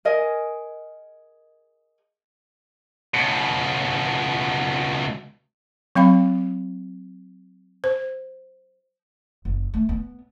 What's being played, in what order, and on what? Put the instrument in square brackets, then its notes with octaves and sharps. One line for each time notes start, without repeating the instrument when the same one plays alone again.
[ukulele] G#4 A#4 D#5 G#5
[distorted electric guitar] C#2 B2
[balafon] F#3 C4 F5 B5
C5
[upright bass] F#1
A3
B3